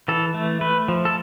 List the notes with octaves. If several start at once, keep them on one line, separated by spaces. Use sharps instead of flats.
E3 A4
A3
A3 B4
F3
A4